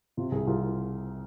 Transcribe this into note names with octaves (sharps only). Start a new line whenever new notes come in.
C3 F4
C2 G#4
C2 F4
F4